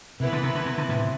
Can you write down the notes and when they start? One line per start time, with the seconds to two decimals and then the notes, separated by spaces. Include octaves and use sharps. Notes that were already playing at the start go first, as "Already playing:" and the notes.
0.20 C3 E3 B3 E4 B4
0.33 D3
0.43 C3
0.55 D3
0.66 C3
0.78 D3
0.89 A2 C3